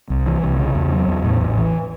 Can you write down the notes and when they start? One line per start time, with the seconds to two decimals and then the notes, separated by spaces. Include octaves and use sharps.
0.10 C2
0.27 E3
0.43 C2
0.59 C#3
0.75 E2
0.92 F#3
1.08 E2
1.25 A2
1.41 A1
1.58 E3